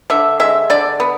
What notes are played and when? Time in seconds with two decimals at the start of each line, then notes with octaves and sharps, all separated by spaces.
0.10 D3 E5
0.40 G#3 E5
0.70 D3 D5
1.00 B3